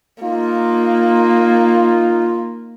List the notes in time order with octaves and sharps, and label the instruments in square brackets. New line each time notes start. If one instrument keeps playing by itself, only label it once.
[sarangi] A#3 [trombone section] D#4 F4